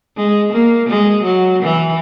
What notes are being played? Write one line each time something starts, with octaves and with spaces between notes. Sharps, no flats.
G#3
A#3
G#3
F#3
E3